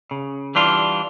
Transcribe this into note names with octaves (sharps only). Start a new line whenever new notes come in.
C#3
E3 G3 D4 F4